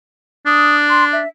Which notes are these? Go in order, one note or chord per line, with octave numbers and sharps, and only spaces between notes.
D4 D#6
C6
E5